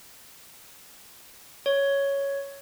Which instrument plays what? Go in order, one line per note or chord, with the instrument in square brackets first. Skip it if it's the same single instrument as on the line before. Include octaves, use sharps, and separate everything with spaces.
[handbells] C#5